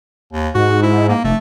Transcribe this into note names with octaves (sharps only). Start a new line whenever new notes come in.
D#2
G#2 F#4
E4
A#3
F1 A3